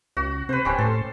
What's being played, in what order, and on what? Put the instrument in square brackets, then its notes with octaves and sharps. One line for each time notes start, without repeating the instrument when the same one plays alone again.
[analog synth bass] C#2 [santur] F#4
[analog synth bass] C3 [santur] B4 C5
[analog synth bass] D1 [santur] G3 C#4 C5
[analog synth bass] A2 [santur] A4 C6